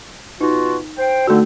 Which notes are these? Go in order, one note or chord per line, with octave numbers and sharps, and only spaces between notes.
B2 D#4 F4 F#4
C5 G5
D3 A3 D#4 F#4